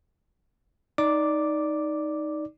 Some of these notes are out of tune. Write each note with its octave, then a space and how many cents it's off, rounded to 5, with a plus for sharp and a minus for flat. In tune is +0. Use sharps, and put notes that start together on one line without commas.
D#4 +0 D5 -10 D6 +0